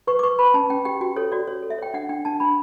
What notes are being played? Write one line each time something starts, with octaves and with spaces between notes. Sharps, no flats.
B4 C#6
D6
B4 C#6
B4 B5
C#4 A5
C#4 G5
G4 G5
F#4 G5
A4 C#5
F#4 D5
C#5
A4
E5
C#5 G5
D4 F#5
D4 G5
D4 A5
D4 B5